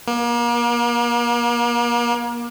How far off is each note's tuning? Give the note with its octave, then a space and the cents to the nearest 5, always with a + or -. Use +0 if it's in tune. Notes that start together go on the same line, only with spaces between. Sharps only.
A#3 +35